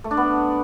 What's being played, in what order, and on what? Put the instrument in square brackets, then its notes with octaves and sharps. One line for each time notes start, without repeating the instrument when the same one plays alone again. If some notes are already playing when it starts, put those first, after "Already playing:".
[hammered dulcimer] A3
D4
B3